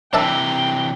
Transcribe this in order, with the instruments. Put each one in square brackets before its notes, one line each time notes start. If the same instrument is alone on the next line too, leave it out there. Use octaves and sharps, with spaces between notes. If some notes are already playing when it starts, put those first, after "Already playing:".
[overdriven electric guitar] C3 E3 [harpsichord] D4 E5 A5 [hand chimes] A#4 A#5 [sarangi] G5